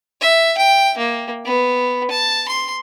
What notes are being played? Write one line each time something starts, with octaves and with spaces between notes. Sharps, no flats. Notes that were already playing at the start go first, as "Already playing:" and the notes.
E5
G5
A#3
B3
A5
C6